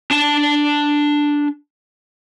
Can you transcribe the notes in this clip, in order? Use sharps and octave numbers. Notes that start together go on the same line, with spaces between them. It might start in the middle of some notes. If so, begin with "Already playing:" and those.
D4 A5